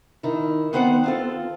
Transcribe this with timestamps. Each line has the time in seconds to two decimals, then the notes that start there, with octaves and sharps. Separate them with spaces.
0.23 D#3 E4
0.73 D#3 B3 C4 C5 D5 F#5
1.04 C4 F4 A4